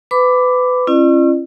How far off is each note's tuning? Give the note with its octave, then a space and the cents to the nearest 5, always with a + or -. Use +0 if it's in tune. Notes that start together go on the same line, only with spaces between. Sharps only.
B4 +25 B5 +15 D6 +0
C#4 -40 E4 +45 D5 +45